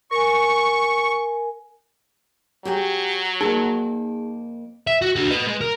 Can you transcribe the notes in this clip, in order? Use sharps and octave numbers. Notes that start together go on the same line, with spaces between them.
A#4 G#5 C#6
F#3 G4 G#4 G5
F2 A#3 D#4 G#4 A5
E5
F#4
D4 F#4
B4 D#5
G#3
A#4